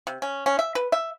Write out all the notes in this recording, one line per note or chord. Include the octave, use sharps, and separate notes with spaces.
C3
C#4
C#4
E5
B4
E5